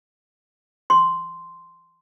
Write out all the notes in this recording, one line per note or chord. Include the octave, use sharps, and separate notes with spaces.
C6